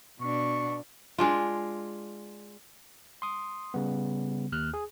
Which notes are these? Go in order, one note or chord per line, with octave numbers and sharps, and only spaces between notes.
B2 D4 C#6
G#3 D4 F4
C6 D#6
C#3 G3 B3
D#2 F6 F#6
G#4